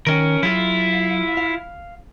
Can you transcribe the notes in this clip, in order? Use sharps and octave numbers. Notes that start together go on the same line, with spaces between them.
D#3 C#4 A#4 D#5 G5
F#3 E4 F4 G#4
F5